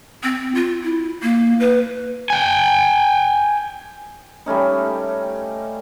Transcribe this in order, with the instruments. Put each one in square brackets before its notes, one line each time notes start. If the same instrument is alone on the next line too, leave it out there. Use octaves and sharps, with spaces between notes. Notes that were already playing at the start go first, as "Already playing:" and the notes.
[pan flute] C4
F4
E4
A#3
B4
[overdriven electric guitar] G5 G#5
[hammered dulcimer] G3 A3 C#4 D#4